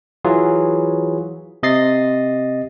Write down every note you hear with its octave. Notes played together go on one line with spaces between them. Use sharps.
E3 F#3 F4 G#4
C3 D#5 A6 C7